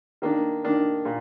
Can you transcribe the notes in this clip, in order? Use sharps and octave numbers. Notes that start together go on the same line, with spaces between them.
D#3 A#3 D4
D#3 A#3 D4
A#2